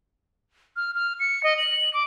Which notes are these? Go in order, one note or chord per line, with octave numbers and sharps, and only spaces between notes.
F6
F6
C#7
D#5
F#7
D6